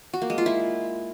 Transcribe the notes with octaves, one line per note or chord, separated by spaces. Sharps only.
F#4
A#3
G#3
F4
E4